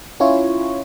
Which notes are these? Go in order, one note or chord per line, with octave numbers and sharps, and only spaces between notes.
C#4 E4 F4 C#5